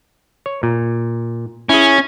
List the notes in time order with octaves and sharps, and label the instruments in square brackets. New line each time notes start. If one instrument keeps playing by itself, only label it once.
[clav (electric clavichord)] C#5
A#2
[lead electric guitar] C#4 [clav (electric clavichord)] E4 G#4